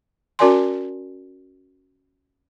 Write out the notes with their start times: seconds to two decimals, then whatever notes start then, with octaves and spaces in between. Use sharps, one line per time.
0.39 C#4 F#4 A#4 D5 G#5 C6